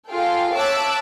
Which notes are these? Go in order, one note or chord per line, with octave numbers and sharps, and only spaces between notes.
F4 G#4 A4 F5 G5
C#5 E5 A5 D6 E6 F#6